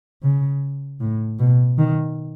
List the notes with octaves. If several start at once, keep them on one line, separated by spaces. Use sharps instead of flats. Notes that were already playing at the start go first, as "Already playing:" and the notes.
C#3
A2
B2
D#3